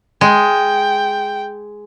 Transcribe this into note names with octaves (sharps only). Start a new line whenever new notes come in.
G#3 G5